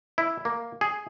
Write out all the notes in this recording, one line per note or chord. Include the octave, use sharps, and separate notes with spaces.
E4
A#3
G#4